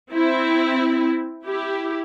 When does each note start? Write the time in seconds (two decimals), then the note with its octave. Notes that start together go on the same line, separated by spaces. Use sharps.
0.12 C4 E4
1.47 E4 G4